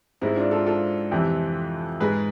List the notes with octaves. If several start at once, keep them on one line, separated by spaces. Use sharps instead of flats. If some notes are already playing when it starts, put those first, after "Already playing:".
G#2 G#3 C4 E4
D4 F4
F4 A4
F4 A4
F2 C3 E3
G#2 G#3 G#4 B4